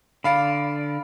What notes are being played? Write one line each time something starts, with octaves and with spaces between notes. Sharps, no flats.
D3 D5 F5 B5